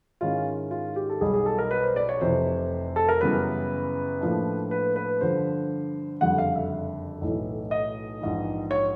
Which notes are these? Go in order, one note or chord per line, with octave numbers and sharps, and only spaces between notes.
G#2 D#3 G#3 C#4 E4 F4
F4
G4
A4
B1 B2 G3 G#4
G#4
A4
A#4
B4
C5
D5
C#5
F1 F2 C3 E3 C5
A4
A#4
F#2 C#3 E3 G3 B3 B4
A2 F3 A#3 D4
B4
B4
G2 D3 F3 C5
F#1 F2 D3 G3 F#5
F5
E5
B1 A2 E3
D#5
A#1 G#2 E3
C#5